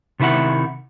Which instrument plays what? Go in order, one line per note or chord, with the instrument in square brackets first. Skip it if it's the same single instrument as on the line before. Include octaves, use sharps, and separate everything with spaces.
[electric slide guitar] C3 D#3 E4 E5 F#5